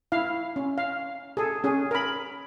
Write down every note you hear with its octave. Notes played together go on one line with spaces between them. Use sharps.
E4 F5
C#4
F5
G#4 A4
C#4 G#4
A#4 B5